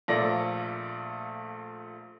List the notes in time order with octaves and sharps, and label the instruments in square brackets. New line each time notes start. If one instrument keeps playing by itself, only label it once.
[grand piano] A#1 A#2 A3 A#3 D5 A#6